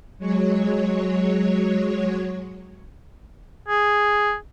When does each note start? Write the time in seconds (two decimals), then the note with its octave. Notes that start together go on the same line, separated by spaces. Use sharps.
0.18 F#3 G#3 C#5
3.68 G#4